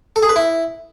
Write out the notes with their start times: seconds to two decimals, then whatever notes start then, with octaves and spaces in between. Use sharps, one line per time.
0.16 A4
0.23 G#4
0.29 B4
0.36 E4